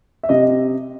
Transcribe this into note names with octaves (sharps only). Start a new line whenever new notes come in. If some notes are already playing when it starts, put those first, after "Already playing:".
E5
C3 D#5